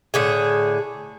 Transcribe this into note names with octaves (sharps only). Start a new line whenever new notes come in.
A2 D3 G#4